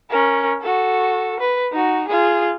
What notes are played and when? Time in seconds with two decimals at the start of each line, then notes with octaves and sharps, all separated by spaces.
0.10 C#4 A#4
0.61 F#4 A4
1.40 B4
1.72 D#4 F#4
2.08 F4 G#4